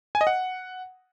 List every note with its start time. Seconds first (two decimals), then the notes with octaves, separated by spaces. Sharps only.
0.15 G#5
0.21 D#5
0.27 F#5